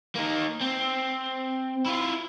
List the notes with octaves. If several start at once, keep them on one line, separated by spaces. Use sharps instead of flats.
A#3 D#4
C4
E4 F4